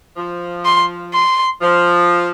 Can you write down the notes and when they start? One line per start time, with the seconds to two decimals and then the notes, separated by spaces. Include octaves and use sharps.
0.17 F3
0.65 C6
1.14 C6
1.61 F3